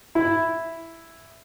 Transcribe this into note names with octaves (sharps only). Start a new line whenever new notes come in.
E4